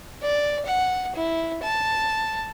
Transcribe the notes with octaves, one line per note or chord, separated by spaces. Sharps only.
D5
F#5
E4
A5